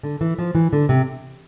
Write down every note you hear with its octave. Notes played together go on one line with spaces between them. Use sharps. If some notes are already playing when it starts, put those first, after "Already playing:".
D3
E3
F3
E3
D3
C3